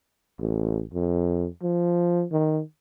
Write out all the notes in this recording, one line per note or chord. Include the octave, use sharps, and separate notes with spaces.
A1
F2
F3
D#3